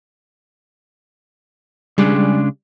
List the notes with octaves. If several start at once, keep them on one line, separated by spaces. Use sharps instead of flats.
C#3 G3 G#3 D4